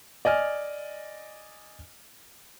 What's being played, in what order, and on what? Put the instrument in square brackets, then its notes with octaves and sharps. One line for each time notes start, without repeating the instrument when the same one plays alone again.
[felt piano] D5 D#5 G#5 F6